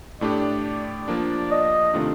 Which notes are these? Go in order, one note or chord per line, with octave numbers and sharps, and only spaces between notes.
A2 A3 D4 G4 D5
F3 A#3 D4
D#5
C3 D#3 A3 D4 F4